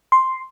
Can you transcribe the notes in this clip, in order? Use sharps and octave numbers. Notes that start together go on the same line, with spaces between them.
C6